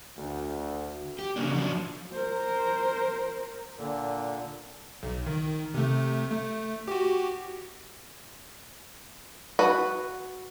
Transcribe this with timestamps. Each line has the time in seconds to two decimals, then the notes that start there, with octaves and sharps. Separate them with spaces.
0.17 D2
1.19 G4
1.36 C#3 A#3 D4
1.53 F3 F#3 D4
2.12 A#4 C5
3.76 A#2 D3
5.03 B1
5.26 D#3
5.74 C3 A3
6.30 A3
6.88 F#4 G4
9.59 F#4 B4